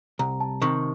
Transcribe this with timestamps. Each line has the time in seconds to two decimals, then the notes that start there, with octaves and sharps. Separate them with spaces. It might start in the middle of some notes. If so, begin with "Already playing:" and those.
0.19 C2 A#5
0.40 A5
0.62 C3 D#3 C#6